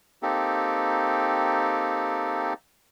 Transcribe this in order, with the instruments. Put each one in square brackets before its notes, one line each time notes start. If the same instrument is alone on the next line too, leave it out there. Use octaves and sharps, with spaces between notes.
[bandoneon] A#3 C4 D#4 G4 A4